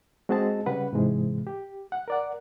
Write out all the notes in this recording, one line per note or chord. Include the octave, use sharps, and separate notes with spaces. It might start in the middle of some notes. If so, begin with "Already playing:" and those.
G#3 C4 F#4 G#4 D#5 A5
C#3 G3 B4 F#5
G#2 C3 E3 G#3
G4
F#5
A#4 D5 F#5